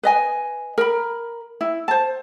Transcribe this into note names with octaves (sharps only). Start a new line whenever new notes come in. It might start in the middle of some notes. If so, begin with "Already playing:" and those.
B4 D#5 G#5
A#4 B5
E4
C5 A5